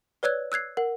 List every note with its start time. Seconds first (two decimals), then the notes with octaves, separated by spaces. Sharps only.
0.23 B4 C#5 D5 E6 F#6 G#6
0.52 E6 F#6 G#6 C7
0.77 A#4 F#5